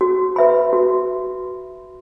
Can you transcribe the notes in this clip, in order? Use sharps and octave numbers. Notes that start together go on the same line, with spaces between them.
F#4
B4 E5 B5
F#4